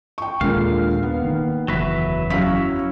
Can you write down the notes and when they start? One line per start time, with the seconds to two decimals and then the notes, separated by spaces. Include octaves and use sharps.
0.18 G5 C#6
0.41 D#2 A#2 D3 G#3 F5
1.03 B3
1.22 D#3 A#3
1.68 F#1 E2 F#3 B4 E5
2.30 F#3 C#4 E4 F5 B6